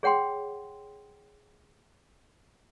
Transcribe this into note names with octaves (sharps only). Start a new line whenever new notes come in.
G#4 C#5 F#5 G5 C6